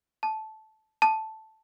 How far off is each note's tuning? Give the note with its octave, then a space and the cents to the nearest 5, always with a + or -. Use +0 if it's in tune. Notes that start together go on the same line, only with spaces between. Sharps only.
A5 -10
A5 +0